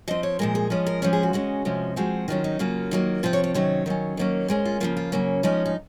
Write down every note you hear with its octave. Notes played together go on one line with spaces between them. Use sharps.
F3 C4 D#5
C#5
A#2 F3 G#3 A#4
G#4
F3 G#3 C#4 G#4
A#4
F3 G#3 C#4 G#4
G#4
F#4
C#3 G#3 C#4
C3 F3 G#3 C#4
F3 G#3 C4 F#4
D#3 F#3 C#4 F4
D#4
C#3 F#3 A#3 F4
D#3 F#3 A#3
C3 F3 C4 F4
C#5
C#5
C3 D#3 F#3 C#4 C#5
D#3 F#3 C#4
D#3 F#3 A#3 C#4
A#2 G#3 C#4 C5
F4
C#3 F3 A#3 F4
F4
C#3 F#3 A#3 C#4
F3 G#3 C#4 D#4
D#4